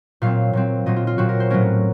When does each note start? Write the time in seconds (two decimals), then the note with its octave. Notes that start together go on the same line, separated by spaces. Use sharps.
0.22 A#2 F#3 C4 F5
0.53 A#2 F#3 C4
0.86 A#2 F#3 C4 D#5
0.96 F4
1.07 F4
1.18 A#2 F#3 C4 F#4
1.29 A#4
1.40 C5
1.50 A2 F#3 A3 C#4 A#4